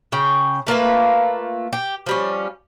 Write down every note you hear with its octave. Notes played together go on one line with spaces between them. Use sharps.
C#3 C#4 G5
A3 A#3 F4 B4
G4
F3 G3 C#4